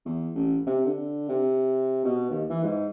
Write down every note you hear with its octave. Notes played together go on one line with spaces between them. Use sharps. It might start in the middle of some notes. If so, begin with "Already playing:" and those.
E2
A1
C3
D3
C3
B2
D#2
E3
G#2